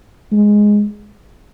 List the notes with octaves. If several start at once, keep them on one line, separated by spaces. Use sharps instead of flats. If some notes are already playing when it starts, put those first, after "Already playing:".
G#3